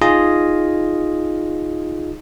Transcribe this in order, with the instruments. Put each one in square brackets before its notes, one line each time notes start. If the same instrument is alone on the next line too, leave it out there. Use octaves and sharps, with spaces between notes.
[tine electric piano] D#4 F4 G#4 D#5